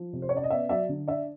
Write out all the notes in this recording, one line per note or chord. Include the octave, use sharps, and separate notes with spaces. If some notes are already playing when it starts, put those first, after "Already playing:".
Already playing: F3
C3
C5
C#5
C#4 D5
D#5
B3 D5 E5
F#3 D5 E5
D3
D4 D5 E5